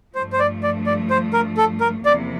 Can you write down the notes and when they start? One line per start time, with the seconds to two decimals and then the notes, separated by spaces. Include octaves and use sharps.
0.15 G2 F3 A3 C5
0.33 C5
0.39 D5
0.63 D5
0.86 D5
1.10 C5
1.33 A#4
1.57 A4
1.81 A#4
2.04 E2 C3 F3 A#3 E4 D5